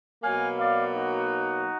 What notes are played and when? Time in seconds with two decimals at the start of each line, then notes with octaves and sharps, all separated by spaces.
0.23 B2 F#3 A#3 F5 G#5
0.59 D5 F5
0.96 D#4 F#4